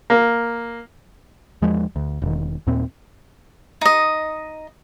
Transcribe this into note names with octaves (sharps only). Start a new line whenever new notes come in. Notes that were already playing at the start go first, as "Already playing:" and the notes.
A#3
E2 F3 G#3
D2
E1 D#3
D#2 A#2 C4
D#4 D#5